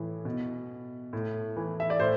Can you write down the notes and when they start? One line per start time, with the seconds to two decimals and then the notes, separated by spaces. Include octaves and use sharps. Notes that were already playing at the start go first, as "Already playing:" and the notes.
Already playing: A2 E3
0.25 B2
1.13 A2
1.57 E3
1.80 E5
1.90 D5
2.00 A2 C5